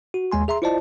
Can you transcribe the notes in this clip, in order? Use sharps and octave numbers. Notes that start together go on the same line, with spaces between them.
F#4
D#2 G#3 G#5 C6
G#4 E5 A#5 C6
E4 F4 C5 D5 D#5 A5